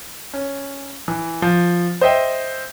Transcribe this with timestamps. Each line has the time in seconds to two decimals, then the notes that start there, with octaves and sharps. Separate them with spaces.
0.34 C#4
1.08 E3
1.42 F3
2.01 C5 D#5 E5 G5